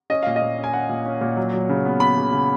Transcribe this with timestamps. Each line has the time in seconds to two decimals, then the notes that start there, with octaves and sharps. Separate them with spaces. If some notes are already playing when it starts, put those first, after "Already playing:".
0.10 C#4 D#5
0.23 A#2 F5
0.36 D#5
0.42 A#2
0.58 C#4
0.64 G#5
0.73 C#4 F#5
0.89 A#2
1.06 C#4
1.21 A#2
1.37 F#3
1.53 F#3
1.69 C#3
1.85 B3
2.00 B3 B5
2.17 C#3
2.32 C#3